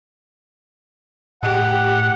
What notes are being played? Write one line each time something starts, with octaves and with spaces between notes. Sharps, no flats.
A2 G4 F#5